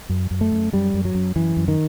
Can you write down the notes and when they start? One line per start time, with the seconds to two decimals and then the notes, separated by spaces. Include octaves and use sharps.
0.09 F#2
0.31 F#2
0.41 A3
0.52 F#2
0.73 F#2 G3
0.94 F#2
1.05 F#3
1.15 F#2
1.36 F#2 E3
1.57 F#2
1.68 D#3